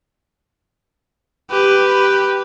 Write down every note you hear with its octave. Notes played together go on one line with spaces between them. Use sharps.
G4 B4